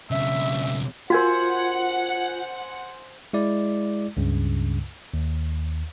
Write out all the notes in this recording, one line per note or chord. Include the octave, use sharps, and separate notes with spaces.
B1 C#3 E5
F4 F#4 A#4 C5 F#5 G#5 B5
G#3 E4 D5
C#2 G2 C#3
D#2